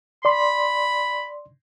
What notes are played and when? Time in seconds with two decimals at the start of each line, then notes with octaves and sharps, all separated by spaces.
0.25 D5 B5 C6